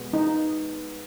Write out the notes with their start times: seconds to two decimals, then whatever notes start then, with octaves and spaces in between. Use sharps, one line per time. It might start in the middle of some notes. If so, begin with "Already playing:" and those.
Already playing: B2 G#3 B3
0.13 D#4